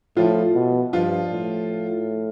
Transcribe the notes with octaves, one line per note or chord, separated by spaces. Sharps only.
A2 F3 F4
B2
G2 F3 F4
A2